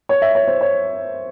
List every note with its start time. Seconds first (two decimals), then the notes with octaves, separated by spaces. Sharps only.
0.09 C#5
0.22 E5
0.35 C#5
0.47 C5
0.61 C#5